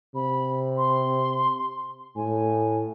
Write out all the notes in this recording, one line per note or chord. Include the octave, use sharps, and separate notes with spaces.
C3 B5
C6
A2 G#5